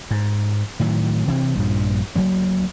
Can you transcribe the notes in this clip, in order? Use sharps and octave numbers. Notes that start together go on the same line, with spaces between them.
G#2
A2 D#3 F#3
C3 E3 C4
A#1 G2 F3
D2 F#3 G#3 A#3